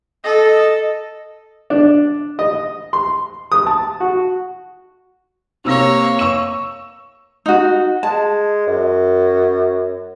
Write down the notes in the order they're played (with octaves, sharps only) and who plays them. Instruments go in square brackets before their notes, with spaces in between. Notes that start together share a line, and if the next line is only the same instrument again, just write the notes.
[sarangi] A4 [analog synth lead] D#5
[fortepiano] D4
D#5
C6
D#6
A5
F#4
[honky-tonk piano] C3 E6 A#6 [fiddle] A#3 C#5
[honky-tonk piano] C#6 E6 E7
[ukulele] D#4 F#4
[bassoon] G#3 [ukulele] A5
[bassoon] F#2